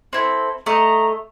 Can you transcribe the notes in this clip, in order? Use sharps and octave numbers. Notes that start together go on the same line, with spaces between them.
C4 E4 A4
A3 D#5 A#5